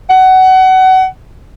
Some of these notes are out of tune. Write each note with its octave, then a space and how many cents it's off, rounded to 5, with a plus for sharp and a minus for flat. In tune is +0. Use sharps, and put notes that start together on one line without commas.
F#5 +25